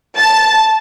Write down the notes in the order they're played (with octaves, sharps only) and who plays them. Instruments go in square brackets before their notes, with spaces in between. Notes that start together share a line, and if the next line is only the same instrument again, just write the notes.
[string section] A5